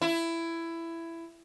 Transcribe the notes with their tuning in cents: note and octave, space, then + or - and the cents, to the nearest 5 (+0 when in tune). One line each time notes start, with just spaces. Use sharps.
E4 +15